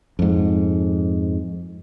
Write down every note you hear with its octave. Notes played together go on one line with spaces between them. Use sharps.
F2 G#2